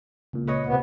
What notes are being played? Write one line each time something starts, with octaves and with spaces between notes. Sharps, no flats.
C#2 A#2
B4 C#5 D#5
C3 B3